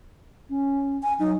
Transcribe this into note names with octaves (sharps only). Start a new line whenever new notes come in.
C#4
G#5
F#3 D#4